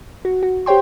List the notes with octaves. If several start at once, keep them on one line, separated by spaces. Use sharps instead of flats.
F#4
F#4
G4 C5 C#5 G5 C6